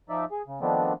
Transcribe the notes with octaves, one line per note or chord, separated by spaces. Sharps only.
F3 D#4 D5 E5
G#4
C#3
D#3 F3 A3 B3 C4 D4